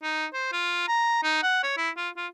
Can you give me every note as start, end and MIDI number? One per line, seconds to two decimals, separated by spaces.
0.03 0.26 63
0.34 0.50 72
0.53 0.84 65
0.88 1.19 82
1.23 1.42 63
1.43 1.61 78
1.63 1.77 73
1.77 1.90 64
1.97 2.09 65
2.17 2.27 65